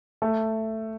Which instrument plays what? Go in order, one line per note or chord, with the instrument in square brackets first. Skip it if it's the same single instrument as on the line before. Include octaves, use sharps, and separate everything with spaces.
[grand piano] A3